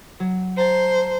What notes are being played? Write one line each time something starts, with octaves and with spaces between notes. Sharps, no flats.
F#3
C5 A5 A#5